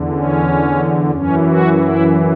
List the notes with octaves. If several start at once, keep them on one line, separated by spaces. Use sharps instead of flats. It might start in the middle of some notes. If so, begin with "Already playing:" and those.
Already playing: E2 D3
C#4
F#2 E3 C#4
F#4
E4